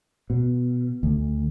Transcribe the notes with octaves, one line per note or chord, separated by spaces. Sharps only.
B2
D2